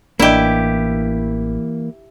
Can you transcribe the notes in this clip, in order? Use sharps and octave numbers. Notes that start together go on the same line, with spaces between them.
A1 E3 A#3 D4 E4 G4 D5 D#5